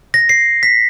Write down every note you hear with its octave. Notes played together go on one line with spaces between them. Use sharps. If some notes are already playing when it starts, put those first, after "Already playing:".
A#6
C7
B6